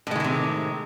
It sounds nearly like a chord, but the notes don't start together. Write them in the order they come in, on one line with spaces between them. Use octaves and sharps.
A2 G#3 E3 D#3 C3